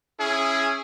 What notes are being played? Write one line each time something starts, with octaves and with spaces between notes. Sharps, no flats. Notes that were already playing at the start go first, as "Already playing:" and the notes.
C#4 E4 G#4